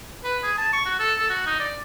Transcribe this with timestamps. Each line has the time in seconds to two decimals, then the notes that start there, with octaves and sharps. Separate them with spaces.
0.24 B4
0.43 G#4
0.58 A5
0.73 C#6
0.85 F#4
0.99 A4
1.18 A4
1.30 F#4
1.46 D#4
1.59 D5